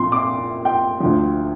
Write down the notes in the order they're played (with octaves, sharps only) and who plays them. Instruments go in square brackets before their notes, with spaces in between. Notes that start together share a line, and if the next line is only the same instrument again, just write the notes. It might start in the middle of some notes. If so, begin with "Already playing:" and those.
Already playing: [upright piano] A#2 F3 C4 C6
D6
G5
D2 D3 F3